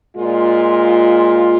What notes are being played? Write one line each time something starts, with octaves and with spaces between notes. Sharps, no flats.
A#2 G#3 F4